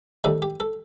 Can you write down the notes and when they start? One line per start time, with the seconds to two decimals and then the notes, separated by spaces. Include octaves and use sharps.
0.24 D2 C3 D#3 G3 A4
0.42 G4
0.60 A4